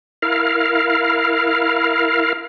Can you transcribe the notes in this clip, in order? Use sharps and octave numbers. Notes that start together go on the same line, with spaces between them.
E4 A#4 F5